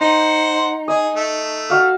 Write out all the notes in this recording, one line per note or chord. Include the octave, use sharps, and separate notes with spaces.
D#4 C5 F#5
G#4 D#5
A3
F#4 F5